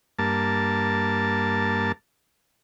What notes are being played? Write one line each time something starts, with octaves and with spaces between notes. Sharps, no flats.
G2 A#3 A5